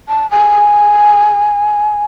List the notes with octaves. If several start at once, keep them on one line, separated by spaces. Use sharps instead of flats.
A5
G#5